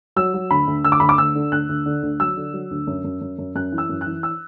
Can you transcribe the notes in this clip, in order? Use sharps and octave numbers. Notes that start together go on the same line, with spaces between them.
F#3 E6
F#3
D2 B5
D2
D2 E6
D6
D2 B5
D6
D2 E6
D3
D2 F#6
D2
D3
D2
F#3 E6
D3
F#3
D2
F#2
F#2
F#2
F#2
F#2 F#6
E3
E6
F#2
F#6
E3
E6